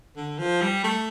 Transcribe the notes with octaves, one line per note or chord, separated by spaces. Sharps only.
D3
F3
G3
A3